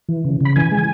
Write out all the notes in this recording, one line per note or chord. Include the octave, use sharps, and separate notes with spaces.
E3
C#3
C#3 B5
E3 G#5
G#3